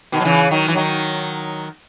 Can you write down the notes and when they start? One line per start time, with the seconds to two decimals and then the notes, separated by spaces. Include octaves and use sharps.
0.12 B2 D#3
0.20 F#3
0.25 C#3 E3
0.51 D#3 F#3
0.68 E3
0.75 D#3 F#3